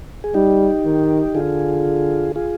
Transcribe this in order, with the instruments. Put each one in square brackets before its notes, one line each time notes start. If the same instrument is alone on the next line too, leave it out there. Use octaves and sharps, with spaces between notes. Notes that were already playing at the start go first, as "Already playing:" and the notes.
[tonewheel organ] G#4
[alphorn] G3 [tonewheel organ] D#4 G4
[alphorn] D#3
[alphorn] D3 [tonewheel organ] F4 G#4
[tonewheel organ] F4 G#4